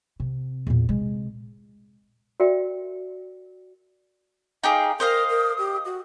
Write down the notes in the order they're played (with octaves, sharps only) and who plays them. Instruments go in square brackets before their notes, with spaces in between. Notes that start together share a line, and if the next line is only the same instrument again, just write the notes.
[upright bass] C3
E2 A#2
C3 G#3
[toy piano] F#4 A#4 D5 E5 G5
[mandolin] D#4 G4 G#4 [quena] F5
[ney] A#4 [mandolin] C5 D#5 F5 [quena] D#6
[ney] A#4
G4
F#4